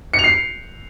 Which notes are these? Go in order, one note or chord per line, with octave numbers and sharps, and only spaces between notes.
C#7
F7
C7